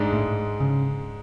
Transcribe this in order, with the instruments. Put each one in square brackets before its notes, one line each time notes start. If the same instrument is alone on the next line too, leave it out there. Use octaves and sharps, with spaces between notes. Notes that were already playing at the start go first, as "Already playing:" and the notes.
Already playing: [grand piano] G#2 G#3 D4
[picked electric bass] A2
C#3